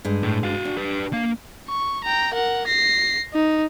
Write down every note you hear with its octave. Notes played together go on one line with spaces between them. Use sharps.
G2 G#3
A2
F#4 F5
D4
G4 B4
A#3 F5
C#6
G5 A#5
A#4 F#5
A#6 C7
D#4